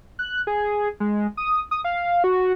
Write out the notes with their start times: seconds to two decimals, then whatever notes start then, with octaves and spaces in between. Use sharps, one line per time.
0.19 F#6
0.47 G#4
1.00 G#3
1.37 D#6
1.71 D#6
1.84 F5
2.24 F#4